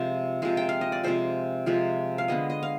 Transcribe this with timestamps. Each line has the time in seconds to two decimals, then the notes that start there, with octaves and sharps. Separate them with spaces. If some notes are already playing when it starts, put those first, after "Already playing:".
Already playing: C3 F3 G#3
0.42 C3 F3 G#3
0.57 G5
0.69 F5
0.81 D#5
0.92 D5
1.04 C3 F3 G#3 C5
1.66 C3 F3 G#3
2.18 F5
2.28 D3 G#3 B3 D#5
2.50 D#5
2.63 F5